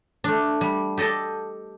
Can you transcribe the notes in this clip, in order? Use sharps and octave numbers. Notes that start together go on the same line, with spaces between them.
A3 D4
G3
G4 A4 D#5 G5 A5